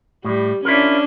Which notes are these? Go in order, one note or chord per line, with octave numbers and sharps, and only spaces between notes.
A2 G3
C#4 D4 E4 F4 A#4